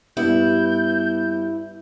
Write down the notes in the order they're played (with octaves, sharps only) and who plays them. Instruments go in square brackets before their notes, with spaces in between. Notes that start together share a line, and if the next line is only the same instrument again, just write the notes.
[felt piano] G2 G3 [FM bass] B3 [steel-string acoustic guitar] E4 [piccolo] G6